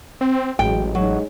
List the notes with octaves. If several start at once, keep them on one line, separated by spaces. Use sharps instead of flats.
C4
A1 F#3 G#3 G5
F#3 G#3 D#4 C#5